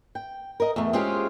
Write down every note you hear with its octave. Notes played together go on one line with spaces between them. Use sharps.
G5
A#4 D#5
E2 A3
G#3 C4 C#4 F4 G4 G#4